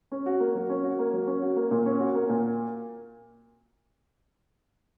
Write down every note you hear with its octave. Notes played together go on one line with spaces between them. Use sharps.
C#4
F#4
A#3
F#3
C#4
F#4
A#3
F#3
C#4
F#4
A#3
A#2
C#4
F#4
A#3
A#2